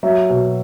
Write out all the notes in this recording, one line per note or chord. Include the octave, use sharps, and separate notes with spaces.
F#3 E5
B2